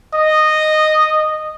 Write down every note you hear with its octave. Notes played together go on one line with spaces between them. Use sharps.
D#5